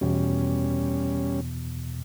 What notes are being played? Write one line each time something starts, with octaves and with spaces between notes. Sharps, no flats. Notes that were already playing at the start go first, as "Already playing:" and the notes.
E2 B2 G3 C#4